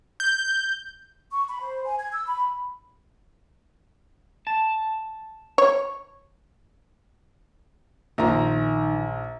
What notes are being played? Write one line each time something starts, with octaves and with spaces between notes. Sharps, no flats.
G6
C#6
B5
C5
G#5
G#6
E6
B5
A5
C#5
A#1 D#3 F4 A#5